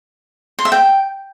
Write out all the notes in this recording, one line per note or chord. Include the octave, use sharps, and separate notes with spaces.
C6
E5
G5